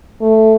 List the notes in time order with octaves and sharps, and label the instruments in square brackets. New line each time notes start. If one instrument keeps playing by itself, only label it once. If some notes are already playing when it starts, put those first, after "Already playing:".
[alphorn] A3